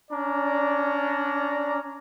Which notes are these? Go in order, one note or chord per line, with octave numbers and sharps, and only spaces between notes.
C#4 D4 D5 A#5